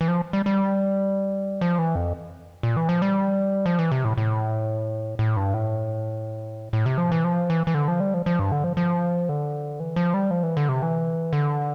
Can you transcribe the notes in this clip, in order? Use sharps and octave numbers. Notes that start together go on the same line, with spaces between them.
E3
F3
G3
G3
F3
E3
F2
A#2
E3
F3
G3
F3
E3
C3
A2
A2
A2
G2
A2
A2
C3
F3
E3
F3
E3
E3
D3
F3
G3
F3
F3
G2
D3
F3
F3
D3
E3
F3
G3
F3
E3
D3
C3
E3
D3